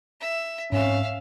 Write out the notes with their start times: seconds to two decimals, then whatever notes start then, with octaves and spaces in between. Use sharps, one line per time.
0.20 E5
0.72 G#2 C4 C#4 E5 F5